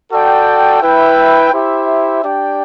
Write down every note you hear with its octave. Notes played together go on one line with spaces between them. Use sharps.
F#4 A4 D5 G5
E4 B4 E5 G5
E4 G4 C5 E5
D4 G4 D5 G5